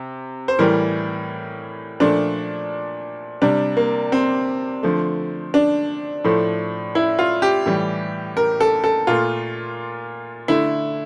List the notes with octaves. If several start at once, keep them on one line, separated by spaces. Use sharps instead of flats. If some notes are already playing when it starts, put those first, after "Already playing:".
Already playing: C3
C5
A2 E3 G3 A#4
A#2 F3 A3 D4
C3 G3 D4
A#3
C4
D3 F3 A3
D4
A2 F3 A3
E4
F4
G4
A2 E3 G3
A#4
A4
A4
A#2 A3 F4
D3 A3 E4